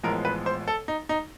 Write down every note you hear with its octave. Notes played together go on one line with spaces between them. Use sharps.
A1 A2 F3 G#3 B3 A#4
B4
C5
A4
D#4
D#4